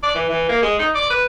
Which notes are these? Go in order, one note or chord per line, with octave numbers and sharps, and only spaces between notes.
D5
E3
E3
A#3
G#3
D#4
D5
B4